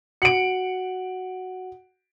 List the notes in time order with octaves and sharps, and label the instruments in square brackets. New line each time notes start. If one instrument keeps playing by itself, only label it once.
[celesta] F#4 F#5 F#7 [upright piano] C#7 D7